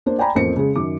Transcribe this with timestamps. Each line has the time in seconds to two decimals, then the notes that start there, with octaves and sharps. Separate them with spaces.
0.06 A#3 D4 C5
0.18 D5 G5 G#5 A#5 B5
0.35 A1 F2 A#3 C5 C#7
0.56 C#3 G#3
0.76 F#2 D#3 D6